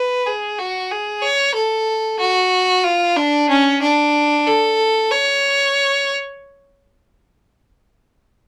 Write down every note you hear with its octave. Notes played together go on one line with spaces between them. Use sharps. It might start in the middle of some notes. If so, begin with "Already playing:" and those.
Already playing: B4
G#4
F#4
G#4
C#5
A4
F#4
F4
D4
C#4
D4
A4
C#5